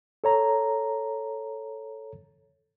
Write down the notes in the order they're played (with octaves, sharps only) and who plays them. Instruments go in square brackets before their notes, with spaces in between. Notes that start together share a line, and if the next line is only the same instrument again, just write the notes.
[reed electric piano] A4 C#5 A#5